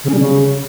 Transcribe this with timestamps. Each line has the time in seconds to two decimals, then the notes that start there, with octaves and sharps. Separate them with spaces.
0.04 C#3
0.09 C#4
0.14 G3
0.19 C#3